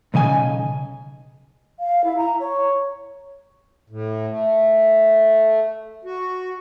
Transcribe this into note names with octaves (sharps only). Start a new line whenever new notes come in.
B1 C#3 D#5 G#5
F5
E4
A#5
C#5
A2
A3
F#4